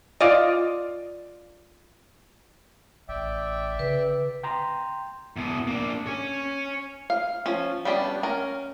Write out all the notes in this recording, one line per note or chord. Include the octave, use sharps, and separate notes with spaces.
F4 D5 D#5
A1 D5 E5 G5
C#3 B4
G5 A#5 C6
E2 B2
A#3 D4
C#5 G#5
F5
F3 C#4
G3 B3 C#4 D4 G4
C#4 A#4